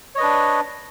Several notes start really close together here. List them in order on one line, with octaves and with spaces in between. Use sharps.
C#5 D#5 B4 D4